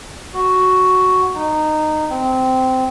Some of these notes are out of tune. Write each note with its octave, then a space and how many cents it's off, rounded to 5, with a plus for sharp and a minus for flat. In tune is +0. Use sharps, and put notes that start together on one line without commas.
F#4 +5
D#4 -15
C4 -15